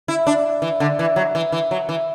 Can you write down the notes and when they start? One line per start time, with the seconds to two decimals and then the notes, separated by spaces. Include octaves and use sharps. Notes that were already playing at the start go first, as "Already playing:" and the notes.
0.08 E4
0.27 D4
0.62 E3
0.80 D3
0.99 E3
1.16 F#3
1.35 E3
1.52 E3
1.71 F#3
1.89 E3